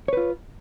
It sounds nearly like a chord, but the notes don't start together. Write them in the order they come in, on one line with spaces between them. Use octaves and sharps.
C#5 B4 F4